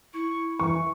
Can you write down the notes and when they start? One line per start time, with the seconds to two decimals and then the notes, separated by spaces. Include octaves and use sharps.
0.13 E4 C#6
0.60 E3 C#6